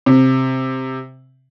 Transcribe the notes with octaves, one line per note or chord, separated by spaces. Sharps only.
C3